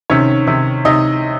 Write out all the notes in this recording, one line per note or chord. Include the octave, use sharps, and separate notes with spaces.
C3 D#3 C#4 C#5
C3 D#3
C3 D#4 D#5